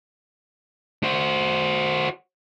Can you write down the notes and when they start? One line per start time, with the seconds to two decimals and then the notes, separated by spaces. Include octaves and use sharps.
1.03 F#4 C5